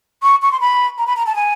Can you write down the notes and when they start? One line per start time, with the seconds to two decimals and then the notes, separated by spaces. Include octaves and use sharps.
0.22 C#6
0.42 C#6
0.52 C6
0.60 B5
0.98 A#5
1.07 B5
1.16 A#5
1.26 A5
1.35 G#5